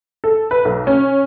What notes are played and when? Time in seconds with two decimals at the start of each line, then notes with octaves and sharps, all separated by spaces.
0.24 A4
0.51 B4
0.65 B1
0.87 C#4